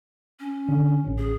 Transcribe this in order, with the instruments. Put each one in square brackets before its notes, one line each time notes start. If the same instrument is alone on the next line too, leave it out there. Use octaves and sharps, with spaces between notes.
[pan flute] C#4
[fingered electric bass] D3
A1 C#4
[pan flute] G#4